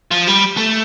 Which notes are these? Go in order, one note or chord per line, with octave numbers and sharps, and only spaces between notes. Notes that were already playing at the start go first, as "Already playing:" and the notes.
F3
G3
A3